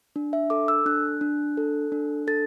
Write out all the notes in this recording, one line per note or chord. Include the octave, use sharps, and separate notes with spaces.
D4
E5
A4 D6
E6
D4 F#6
D4
A4
D4
A4 A6